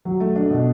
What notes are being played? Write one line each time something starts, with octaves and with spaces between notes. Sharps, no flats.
F#3
A3
D4
B2